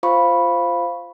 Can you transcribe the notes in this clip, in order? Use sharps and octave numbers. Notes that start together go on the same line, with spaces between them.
F4 C5 F5 B5 C#6